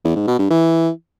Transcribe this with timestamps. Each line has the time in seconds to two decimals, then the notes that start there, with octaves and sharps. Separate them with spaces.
0.04 E2
0.16 G#2
0.28 B2
0.39 G2
0.51 E3